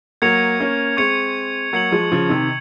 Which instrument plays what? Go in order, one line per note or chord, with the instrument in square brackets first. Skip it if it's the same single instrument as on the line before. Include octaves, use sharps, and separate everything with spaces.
[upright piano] F#3 A#3 [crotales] C#6 G#6 C#7 F7
[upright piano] A#3 C#4
[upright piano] G#3 C4 [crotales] C#6 G#6 C#7 F7
[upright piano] F#3 A#3 [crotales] G#6 C#7 F#7
[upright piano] F3 G#3
C#3 F3
C3 D#3